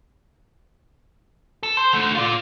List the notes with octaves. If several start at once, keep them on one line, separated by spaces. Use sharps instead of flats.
A4
C5
D3 A3
F4 D5